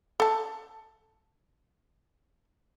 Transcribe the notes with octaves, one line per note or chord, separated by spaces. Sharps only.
A4 A5